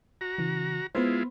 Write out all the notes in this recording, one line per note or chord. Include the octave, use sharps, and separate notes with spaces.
F#4 A#5
C#3 E3
G#3 B3 E4 F4 B4 C5